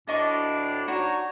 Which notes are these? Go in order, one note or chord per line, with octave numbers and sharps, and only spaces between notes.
D2 A2 D4 D5 D#5 C#6
D4 D#4 F#4 C#5